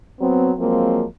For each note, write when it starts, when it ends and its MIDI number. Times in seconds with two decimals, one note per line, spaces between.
0.20 0.52 54
0.20 0.52 59
0.20 0.52 60
0.59 1.05 53
0.59 1.05 54
0.59 1.05 56
0.59 1.05 58
0.59 1.05 60